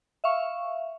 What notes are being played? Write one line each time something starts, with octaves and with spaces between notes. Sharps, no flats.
E5 F5 C#6